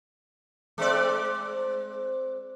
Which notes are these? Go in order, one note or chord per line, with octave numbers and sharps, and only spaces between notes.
G#3 C4 D5